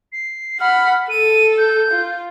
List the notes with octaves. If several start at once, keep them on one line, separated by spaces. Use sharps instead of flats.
C7
F#5 B5 F6
A4 D#7
G6
F4